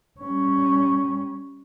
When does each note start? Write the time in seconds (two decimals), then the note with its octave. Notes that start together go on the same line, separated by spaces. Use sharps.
0.20 G3 C#4